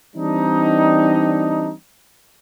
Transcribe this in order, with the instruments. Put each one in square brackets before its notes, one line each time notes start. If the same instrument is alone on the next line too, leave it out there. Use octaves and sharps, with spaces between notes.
[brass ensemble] E3 G3 C4 D4 D#4